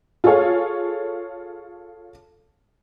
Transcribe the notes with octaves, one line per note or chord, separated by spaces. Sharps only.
F4 G#4 A4 C#5 F5